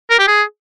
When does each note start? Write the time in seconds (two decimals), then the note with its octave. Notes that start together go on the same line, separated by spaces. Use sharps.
0.11 A#4
0.19 G4
0.28 G#4